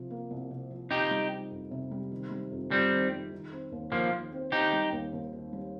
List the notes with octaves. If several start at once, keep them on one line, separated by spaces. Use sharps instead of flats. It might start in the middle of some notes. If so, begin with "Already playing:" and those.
Already playing: C3 F3
A#3
C2
C3
F3
C3 D#4 G4
G3
D#4
F2
C3
G3
D#3
G3
F2
F2 G3 C4
D#3
G3
D#3
C4
D#2
D#2 F3 A#3
D#3
C4
D#3 D#4 G4
G3
D#2
D#2
D#3
G3